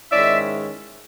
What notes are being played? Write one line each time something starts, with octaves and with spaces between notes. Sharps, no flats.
G#2 D#3 G#3 C#4 E4 D5 E5